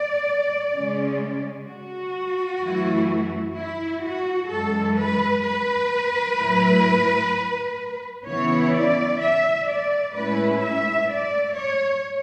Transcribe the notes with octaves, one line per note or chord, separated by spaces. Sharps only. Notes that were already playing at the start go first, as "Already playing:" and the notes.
Already playing: D5
C#3 G#3 C#4
F#4
F#2 E3 A3 E4
E4
F#4
F#2 E3 G#3 A4
B4
B4
A2 F#3 A3 E4
C#3 E3 B3 E4 C#5
D5
E5
D5
A2 G#3 C#4 E4 B4
E5
D5
C#5